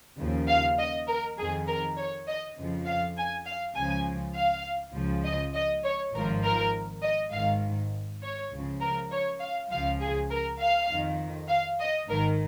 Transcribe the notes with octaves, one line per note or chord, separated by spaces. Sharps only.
D#2 C#3 F3
F5
D#5
A#4
F2 D#3 G#4
A#4
C#5
D#5
F2 C#3 F3
F5
G#5
F5
C#2 C#3 F3 G#5
F5
C#2 C#3 F3
D#5
D#5
C#5
G#1 G#2 F3 A#4
A#4
D#5
G#1 G#2 D#3 F5
C#5
C#2 C#3 F3
A#4
C#5
F5
C#2 C#3 F3 F5
G#4
A#4
F5
F2 D#3
F5
D#5
G#1 G#2 D#3 A#4